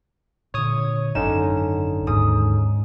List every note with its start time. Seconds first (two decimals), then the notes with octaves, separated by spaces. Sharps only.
0.54 A#2 D3 C#5 D#6
1.15 G#1 F#2 D3 C#4 D#4 E7
2.07 D#2 G#2 D#6